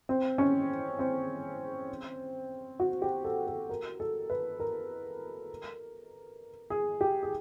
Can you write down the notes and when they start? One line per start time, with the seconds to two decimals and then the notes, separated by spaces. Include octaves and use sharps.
0.09 C4
0.38 C#4
0.99 C4
2.80 F#4
3.02 G4
3.25 A4
3.47 A4
3.69 A#4
4.00 A4
4.30 B4
4.60 A#4
6.70 G#4
7.01 G4
7.23 G#4